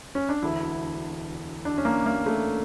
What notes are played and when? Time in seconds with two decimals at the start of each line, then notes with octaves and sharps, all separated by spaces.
0.15 C#4
0.29 D4
0.42 E1 D2 D3 E4
1.65 D4
1.78 C#4
1.85 A#3
2.06 A#3
2.26 A3